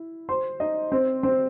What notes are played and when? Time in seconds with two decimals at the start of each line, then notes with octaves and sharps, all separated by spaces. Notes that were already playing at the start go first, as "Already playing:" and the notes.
Already playing: E4
0.29 C5 C6
0.60 D#4 D#5
0.92 C4 C5
1.23 C4 C5